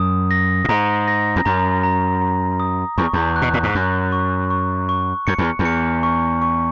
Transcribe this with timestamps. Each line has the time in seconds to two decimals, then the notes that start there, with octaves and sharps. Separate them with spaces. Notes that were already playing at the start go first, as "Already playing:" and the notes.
Already playing: F#2 D#6
0.31 A#6
0.64 A#2
0.69 G#2 A#5
1.08 A#6
1.36 E2
1.45 F#2 A#5
1.83 A#5
2.22 A#5
2.60 D#6
2.98 E2 C#6
3.13 E2
3.36 F#6
3.42 B2
3.54 A#2
3.63 G#2
3.74 F#2 F#6
4.12 C#6
4.50 C#6
4.89 C#6
5.27 F#2 C#7
5.38 E2
5.59 E2
5.65 C#7
6.03 C#6
6.42 C#6